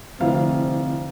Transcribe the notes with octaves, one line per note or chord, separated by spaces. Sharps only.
F1 D3 C4 E4 F5